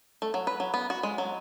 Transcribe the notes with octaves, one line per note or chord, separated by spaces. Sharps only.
A3
F#3
B4
F#3
B3
F#4
G#3
F#3